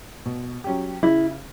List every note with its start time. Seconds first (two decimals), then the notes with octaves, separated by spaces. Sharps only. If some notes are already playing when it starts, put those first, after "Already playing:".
0.26 B2
0.64 F#3 C#4 G4
1.03 C#3 E4